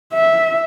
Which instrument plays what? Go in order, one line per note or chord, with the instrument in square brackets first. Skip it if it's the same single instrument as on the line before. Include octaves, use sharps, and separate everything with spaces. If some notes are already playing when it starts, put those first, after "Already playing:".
[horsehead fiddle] E5